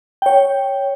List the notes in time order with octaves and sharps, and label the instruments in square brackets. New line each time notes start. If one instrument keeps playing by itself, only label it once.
[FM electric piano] C#5 G5